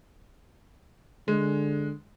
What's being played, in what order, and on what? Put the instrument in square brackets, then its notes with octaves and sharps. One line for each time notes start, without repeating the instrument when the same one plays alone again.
[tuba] D3 [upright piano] G#3